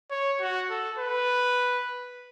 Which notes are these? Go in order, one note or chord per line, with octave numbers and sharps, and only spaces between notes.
C#5
F#4
A4
B4